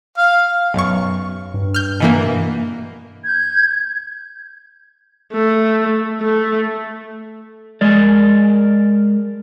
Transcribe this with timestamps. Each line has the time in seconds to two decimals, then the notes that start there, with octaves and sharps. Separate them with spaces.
0.17 F5
0.74 B1 F#2 C#6
1.54 G2
1.74 F6 G6
2.00 B2 E3 A#3
3.25 G6 G#6
5.33 A3
6.21 A3
7.81 G#3 A#4 D5